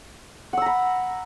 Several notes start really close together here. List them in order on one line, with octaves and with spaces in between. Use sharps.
F#5 E6 A#5 B5